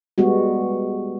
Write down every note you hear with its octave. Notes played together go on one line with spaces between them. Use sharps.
G3 G#3 B3 F#4